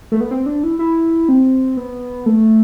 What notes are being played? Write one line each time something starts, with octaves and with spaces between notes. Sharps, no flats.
A3
B3
C4
D4
E4
E4
C4
B3
A3